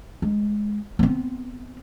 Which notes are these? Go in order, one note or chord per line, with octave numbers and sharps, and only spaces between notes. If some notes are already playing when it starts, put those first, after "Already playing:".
G#3
B3 C4